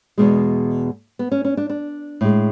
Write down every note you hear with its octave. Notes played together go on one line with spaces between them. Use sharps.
E2 B2 G#3
B3
C#4
C#4
D4
D4
A2 G#3